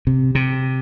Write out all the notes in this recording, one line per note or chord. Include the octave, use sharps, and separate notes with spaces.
C3
C3